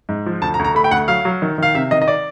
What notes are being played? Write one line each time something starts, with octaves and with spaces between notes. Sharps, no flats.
G#2
F3
D2 A5
A#5
D2
A#5
A3 B5
G5
D2 F#5
F#3 F5
F#3
D#3
D#3 F5
C3 E5
D#3 D#5
D#5
D5